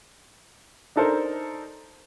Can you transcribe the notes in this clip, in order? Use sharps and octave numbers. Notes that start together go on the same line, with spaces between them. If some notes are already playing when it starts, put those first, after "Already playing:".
D4 D#4 A4 A#4 C5